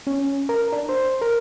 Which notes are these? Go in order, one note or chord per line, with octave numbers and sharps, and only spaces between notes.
C#4
A#4
D4
C5
A#4